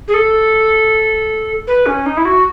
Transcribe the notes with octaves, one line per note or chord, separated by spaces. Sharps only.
G#4
A4
B4
C#4
D#4
E4
F#4